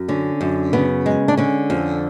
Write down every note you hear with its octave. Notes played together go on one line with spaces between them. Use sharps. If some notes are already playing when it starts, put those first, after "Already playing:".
Already playing: F#2
D3 C#4
F#2
C#3 B3
G#3
D4
D3 C#4
F2